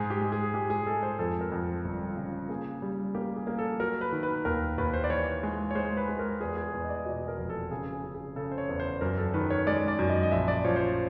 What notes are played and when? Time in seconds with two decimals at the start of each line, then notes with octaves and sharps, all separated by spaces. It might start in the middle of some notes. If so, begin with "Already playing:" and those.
Already playing: G#2 G#4
0.10 G4
0.21 G#3
0.32 G#4
0.54 G#3 G4
0.70 G#4
0.86 G#3 A4
1.03 C5
1.19 F2 A4
1.41 A#4
1.52 F2
1.63 A4
1.85 G1
2.17 C#3
2.49 A#3 G#4
2.82 G3
3.15 A#3 G4
3.36 G#4
3.47 A#3
3.58 A4
3.79 F#3 A#4
4.01 B4
4.12 D#3
4.23 B4
4.45 D#2 A#4
4.78 D#2 B4
4.94 C5
5.04 D5
5.10 E3 C#5
5.43 G#3
5.71 C#5
5.75 G#3 C5
5.97 B4
6.08 G#3
6.19 A#4
6.41 E2 G#4
6.57 G#4
6.73 E2
6.84 D#5
6.89 D5
7.05 B2 D#5
7.28 A#4
7.38 F1
7.50 A4
7.71 C#3 G#4
7.92 G#4
8.04 C#3
8.15 G#4
8.36 C#3 A4
8.52 C5
8.58 C#5
8.69 E2
8.80 C5
9.01 F#2 A#4
9.18 A4
9.34 D#3 B4
9.50 C#5
9.67 G#3 D5
9.88 D5
9.99 F#2
10.10 D#5
10.23 D#5
10.31 A#1 E5
10.48 D5
10.65 F3 C#5
10.76 C5
10.81 C#5